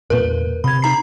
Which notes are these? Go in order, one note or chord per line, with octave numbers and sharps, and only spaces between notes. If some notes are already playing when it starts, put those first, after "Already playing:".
E2 A#2 A#3 A#4 B4
C3 B5 G#6
D#4 A#5 C7